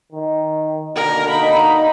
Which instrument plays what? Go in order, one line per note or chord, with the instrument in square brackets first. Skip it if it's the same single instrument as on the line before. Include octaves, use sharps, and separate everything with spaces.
[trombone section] D#3
[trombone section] B2 D3 A#3 [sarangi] A#4
[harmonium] D#4 [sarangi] B5